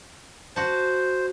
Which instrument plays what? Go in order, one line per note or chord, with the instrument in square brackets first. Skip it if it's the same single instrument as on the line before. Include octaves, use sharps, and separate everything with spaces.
[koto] F#4 A5 [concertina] C5